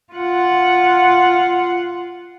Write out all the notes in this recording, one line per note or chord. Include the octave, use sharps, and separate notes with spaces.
F4 F#5